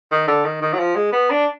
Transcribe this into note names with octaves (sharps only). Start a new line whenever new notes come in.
D#3
D3
D#3
D#3
F#3
F3
G#3
B3
D4